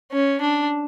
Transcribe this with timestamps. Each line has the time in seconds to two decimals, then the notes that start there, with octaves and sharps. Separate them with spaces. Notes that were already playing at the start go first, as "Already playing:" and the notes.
0.12 C#4
0.41 D4